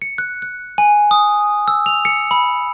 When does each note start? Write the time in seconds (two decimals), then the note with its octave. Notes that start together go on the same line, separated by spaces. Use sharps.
0.02 C#7
0.18 F#6
0.42 F#6
0.78 G#5
1.11 D#6
1.68 E6
1.86 F7
2.05 C#7
2.31 B5